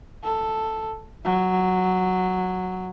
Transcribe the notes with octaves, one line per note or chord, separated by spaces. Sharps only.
A4
F#3